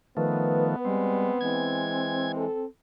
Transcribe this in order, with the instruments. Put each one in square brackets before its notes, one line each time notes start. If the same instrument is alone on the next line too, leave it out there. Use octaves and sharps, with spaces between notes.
[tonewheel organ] D#3 F3 A3 [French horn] B3 [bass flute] B4
[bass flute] G3 [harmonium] G#3 [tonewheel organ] C4
[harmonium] E3 G#3 [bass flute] C4 [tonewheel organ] G#6
[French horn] A4